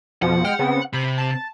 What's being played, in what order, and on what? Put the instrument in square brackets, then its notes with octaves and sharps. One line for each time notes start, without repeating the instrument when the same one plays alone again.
[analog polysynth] F2 B2 F3 [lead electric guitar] F#5
[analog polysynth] G#3 G5 F6
C#3 B3 C4
[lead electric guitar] C3 [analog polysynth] B5
[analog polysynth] A5